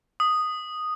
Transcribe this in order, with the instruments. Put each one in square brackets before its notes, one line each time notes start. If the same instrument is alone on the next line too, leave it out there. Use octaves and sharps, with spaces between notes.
[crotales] D#6